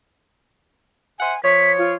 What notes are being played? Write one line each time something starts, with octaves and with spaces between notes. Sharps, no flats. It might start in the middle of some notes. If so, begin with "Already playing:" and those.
C5 E5 F#5 G#5
F3 C#5 B6
F4